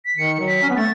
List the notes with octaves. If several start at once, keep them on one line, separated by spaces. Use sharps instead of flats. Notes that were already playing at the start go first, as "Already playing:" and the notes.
B6
D#3 C#7
F#3
B6
C#4
B3
A3 A6